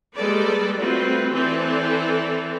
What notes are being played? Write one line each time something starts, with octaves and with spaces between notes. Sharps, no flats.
G3 G#3 A#3 A4 B4 D5
G3 A3 C4 F4 F#4 B4
E3 C4 A4 B4 D5